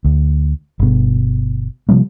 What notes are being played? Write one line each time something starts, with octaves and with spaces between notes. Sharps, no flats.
D2
G1 B2
C3 F3 G3 A#3